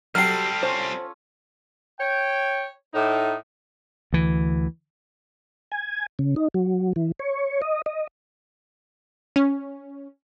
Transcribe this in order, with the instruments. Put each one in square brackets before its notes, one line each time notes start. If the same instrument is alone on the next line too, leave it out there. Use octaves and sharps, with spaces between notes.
[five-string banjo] F#3 G4 [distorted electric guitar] G3 C4 [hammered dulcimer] A4 [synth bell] F6 C7
[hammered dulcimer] C#4 F4 [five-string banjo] C5 G#5
[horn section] C#5 G5
A2 D#4
[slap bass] D2 E3
[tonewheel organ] G#5
C#3
D#4
F#3
E3
C#5
D#5
D#5
[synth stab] C#4